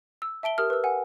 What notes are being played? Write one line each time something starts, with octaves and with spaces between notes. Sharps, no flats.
E6
E5 A5 D7 G7
G4 A#4 D#6 F6
B4 E6
F#5 G#5